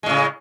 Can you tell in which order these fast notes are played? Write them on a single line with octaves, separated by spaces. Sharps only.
G#3 A2 C#3